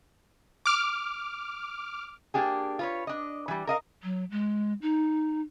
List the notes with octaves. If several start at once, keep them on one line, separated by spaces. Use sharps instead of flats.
D6 F6
A#3 D4 G4 G#4
F4 B4 C#5
D4 D#5
E3 G3
A#4 D#5 F5
F#3
G#3
D#4